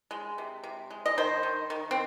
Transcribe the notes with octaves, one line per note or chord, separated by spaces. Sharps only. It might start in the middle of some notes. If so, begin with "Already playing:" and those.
G#3
C3
C3
G#3
D#5
D#3 C5
D#3
D#3
C4